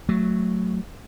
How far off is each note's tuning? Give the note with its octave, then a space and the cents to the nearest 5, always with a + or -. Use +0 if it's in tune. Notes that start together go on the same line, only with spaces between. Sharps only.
F#3 +0 A3 +0